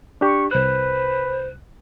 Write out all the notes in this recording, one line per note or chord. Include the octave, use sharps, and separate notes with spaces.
D4 G4 C#6
C2 B4 C5 F#6